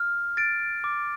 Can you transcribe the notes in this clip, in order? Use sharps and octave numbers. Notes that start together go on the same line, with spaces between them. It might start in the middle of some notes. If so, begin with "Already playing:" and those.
Already playing: F6
A6 D7
D6